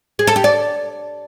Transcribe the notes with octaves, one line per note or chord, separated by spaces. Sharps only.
G#4
A4
G4
D5